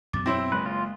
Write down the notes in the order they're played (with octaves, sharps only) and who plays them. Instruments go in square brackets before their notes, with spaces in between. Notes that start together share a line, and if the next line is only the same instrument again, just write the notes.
[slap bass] F#2 B2 F#3 [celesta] D6 A6
[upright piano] C4 E4 [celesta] C#5 C6 A#6
[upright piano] F#1 [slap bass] G#3 A#3 [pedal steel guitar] B4
[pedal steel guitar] F4